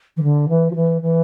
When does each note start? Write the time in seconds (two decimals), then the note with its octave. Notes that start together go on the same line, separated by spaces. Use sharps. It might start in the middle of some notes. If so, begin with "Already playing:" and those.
0.17 E3
0.23 D3
0.49 E3
0.71 F3
0.75 E3
1.02 E3